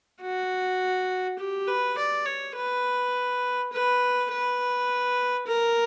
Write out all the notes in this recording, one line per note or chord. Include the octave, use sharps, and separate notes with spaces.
F#4
G4
B4
D5
C#5
B4
B4
B4
A#4